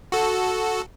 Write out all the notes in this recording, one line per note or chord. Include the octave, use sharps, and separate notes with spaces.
F#4 A4